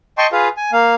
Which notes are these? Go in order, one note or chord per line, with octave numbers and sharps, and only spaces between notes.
D#5 G5 A5 C6 C#6
F4 G#4 B4 F5
G#5
A#3 F5